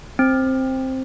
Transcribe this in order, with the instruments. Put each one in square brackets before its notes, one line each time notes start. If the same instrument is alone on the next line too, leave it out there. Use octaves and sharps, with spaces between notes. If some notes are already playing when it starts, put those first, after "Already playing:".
[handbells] C4